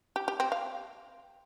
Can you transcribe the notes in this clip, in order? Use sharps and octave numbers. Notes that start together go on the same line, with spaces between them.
G4
G4
C4
F5